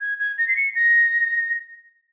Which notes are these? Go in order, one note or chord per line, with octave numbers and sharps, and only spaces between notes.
G#6
G#6
A#6
C7
C#7
A#6